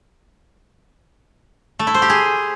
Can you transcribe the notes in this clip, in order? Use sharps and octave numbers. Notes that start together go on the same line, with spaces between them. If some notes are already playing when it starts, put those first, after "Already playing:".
A3
E4
C5
G4
G#4